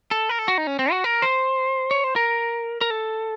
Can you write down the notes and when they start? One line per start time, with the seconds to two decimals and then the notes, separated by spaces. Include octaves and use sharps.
0.11 A4
0.29 A#4
0.39 A4
0.48 F#4
0.58 D#4
0.67 C#4
0.79 C4
0.91 F#4
1.04 A#4
1.22 C5
1.91 C#5
2.04 C5
2.16 A#4
2.81 A#4
2.90 A4